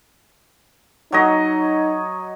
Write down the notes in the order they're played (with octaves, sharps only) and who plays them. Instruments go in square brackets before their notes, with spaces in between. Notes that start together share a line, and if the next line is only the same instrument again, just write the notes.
[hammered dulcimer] F#3 C#5 D#5 [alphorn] D#4